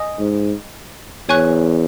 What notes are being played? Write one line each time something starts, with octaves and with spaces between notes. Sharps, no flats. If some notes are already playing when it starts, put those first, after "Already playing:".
Already playing: D#5 G#5 D#6
G#2
E2 C#5 G#5 C#6 F#6